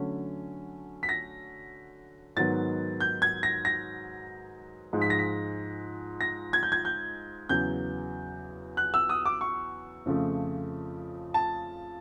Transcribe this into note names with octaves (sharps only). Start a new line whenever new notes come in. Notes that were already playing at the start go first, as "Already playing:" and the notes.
Already playing: D3 F#3 A3 C#4
B6
A#6
G#2 D#3 F#3 B3 A6
G6
G#6
A#6
A#6
G#2 F3 G#3
B6
A#6
B6
A#6
G#6
G6
G#6
G6
E2 C#3 F#3 G6
F#6
E6
D#6
D6
C#6
F2 C#3 F3 A3
A5